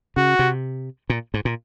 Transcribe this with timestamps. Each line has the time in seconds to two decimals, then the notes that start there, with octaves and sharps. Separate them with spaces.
0.17 C#3 F#4
0.39 C3
1.10 A#2
1.34 G#2
1.45 A#2